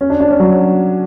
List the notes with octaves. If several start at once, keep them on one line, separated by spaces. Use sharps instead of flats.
C#4
D4
D4
C#4
F#3